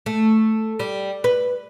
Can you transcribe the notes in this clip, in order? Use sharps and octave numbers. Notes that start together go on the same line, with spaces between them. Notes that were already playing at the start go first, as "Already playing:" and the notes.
A3
G3
B4